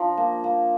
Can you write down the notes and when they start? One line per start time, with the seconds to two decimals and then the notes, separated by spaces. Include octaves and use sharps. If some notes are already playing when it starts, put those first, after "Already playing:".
Already playing: F3 D4 A#5
0.17 A#3
0.44 A#3